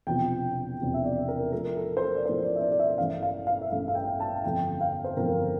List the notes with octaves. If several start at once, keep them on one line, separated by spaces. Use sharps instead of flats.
E1 E2 C3 F3 G5
E1 E2 C3 F3
E5
D5
A#4
A2 F3 A3 A#4
A4
C5
A#4
D5
A2 F3 A3 C5
D5
E5
D5
D5
E5
A1 G2 E3 A3 F5
F5
F5
E5
A1 G2 E3 A3 F5
F5
G5
A5
G1 F2 E3 A3 G5
F5
C5
G1 F2 E3 A3 A#4